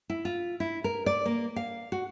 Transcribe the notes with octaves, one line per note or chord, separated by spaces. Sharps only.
E4
F4
E4
A#4
D5
A#3
F5
F#4